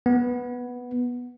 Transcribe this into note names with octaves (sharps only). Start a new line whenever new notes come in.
B3